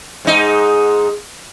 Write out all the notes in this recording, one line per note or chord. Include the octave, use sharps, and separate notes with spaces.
G#2 D#4